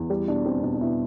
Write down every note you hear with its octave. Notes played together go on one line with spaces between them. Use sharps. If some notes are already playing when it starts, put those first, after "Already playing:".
Already playing: E2
G3
B2 D4
G3 C4
B2 D4
D4
B2 E4